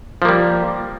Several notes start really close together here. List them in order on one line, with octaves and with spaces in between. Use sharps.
F3 A#3 G3